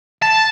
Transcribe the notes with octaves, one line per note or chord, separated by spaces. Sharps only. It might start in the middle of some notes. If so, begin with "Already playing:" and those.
A5